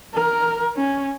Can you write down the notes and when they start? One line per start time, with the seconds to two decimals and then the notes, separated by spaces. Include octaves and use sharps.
0.14 A#4
0.76 C#4